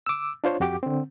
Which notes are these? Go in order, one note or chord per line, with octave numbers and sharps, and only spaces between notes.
D6 E6
D4 F4 C5 C#5
F2 F#4 G4 D6
D3 C4